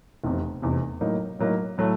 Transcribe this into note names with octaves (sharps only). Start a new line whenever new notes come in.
F1 E2 C3
F1 E2 C3
A2 F#3 A#3 D#4
A2 F#3 A#3 D#4
A2 F#3 A3